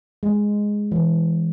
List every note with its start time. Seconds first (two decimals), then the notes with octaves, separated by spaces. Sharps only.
0.23 G#3
0.92 E3